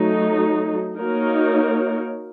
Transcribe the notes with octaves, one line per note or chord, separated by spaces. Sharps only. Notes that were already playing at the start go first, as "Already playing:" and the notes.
Already playing: F#3 A3 D#4
A#3 D#4 F#4 A#4 C#5